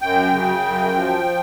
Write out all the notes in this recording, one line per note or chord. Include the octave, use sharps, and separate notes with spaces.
F#2 G5
C#3
F#2
F3